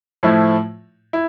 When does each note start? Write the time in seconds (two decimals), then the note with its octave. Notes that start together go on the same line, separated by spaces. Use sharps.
0.23 A2 F3 A3 E4
1.13 E4